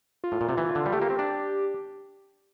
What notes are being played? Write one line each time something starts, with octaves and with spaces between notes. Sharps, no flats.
F4
A2
A#2
C3
E3
D3
G3
A3 G4
A#3
C4
D4